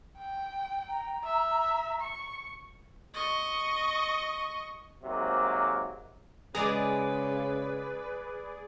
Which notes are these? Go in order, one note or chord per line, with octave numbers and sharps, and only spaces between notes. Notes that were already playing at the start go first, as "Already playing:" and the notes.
G5
A#5
E5
C#6
D#5 C#6
G#2 C3 F#3 A#3
C#3 G#3 G#4 B4 D5 A#5